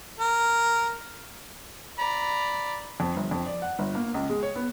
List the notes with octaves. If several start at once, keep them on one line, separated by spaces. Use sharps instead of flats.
A#4
D5 A#5 B5
F2
G1
F2
D5
F#5
G1
A#3
C#2
G#3
C#5
B3